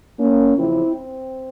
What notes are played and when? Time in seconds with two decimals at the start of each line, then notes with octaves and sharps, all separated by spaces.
0.19 A#3 C#4
0.56 E2 C#3 F3 C4 E4
0.94 C4